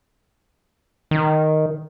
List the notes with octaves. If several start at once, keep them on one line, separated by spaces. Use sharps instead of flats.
D#3